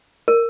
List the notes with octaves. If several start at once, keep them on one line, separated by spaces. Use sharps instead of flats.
A#4